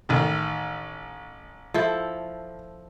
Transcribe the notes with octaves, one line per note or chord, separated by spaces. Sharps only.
A1 D#3
F3 E4 A4